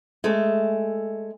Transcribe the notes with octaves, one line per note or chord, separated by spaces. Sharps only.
G#3 A3